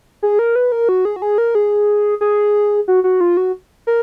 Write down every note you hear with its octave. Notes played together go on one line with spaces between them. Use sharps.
G#4
A#4
B4
A#4
F#4
G#4
F#4
G#4
A#4
G#4
G#4
F#4
F#4
F4
F#4
A#4